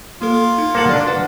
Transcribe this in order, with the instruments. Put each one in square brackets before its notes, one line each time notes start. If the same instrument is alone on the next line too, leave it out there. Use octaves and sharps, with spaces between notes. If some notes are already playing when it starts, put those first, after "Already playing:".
[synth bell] A#3 A4 [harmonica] F4
[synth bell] D#4
[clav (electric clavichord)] A#3 A4 F#5
[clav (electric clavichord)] D4 D#5 [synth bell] D5 A5
[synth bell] B4 F#5